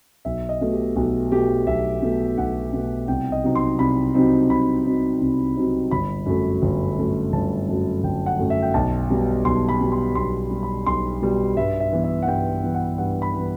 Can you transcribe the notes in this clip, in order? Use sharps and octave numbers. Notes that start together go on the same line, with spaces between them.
B1 E5
D#5
B2 A3
G4
B1 F#4
B2 A3 G4
B1 E5
B2 A3
B1 F#5
B2 A3
C2 G5
D#5
C3 F#3 C4 D#4
C6
C2 B5
C3 F#3 C4 D#4
C2 B5
C3 F#3 C4 D#4
C2
C3 F#3 C4 D#4
G1 B5
F#2 F#3 A3
G1
F#2 F#3 A3
G1 A5
F#2 F#3 A3
G1 G5
F#5
F#2 F#3 A3
E5
G5
B1 A5
B2 G3
B1 C6
B5
B2 G3
C6
B1 C6
B2 G3
B5
B1 C6
B2 G3
G2 E5
E5
E3 B3
E5
F#5
G2 G5
E3 B3
F#5
G2 F#5
B5
E3 B3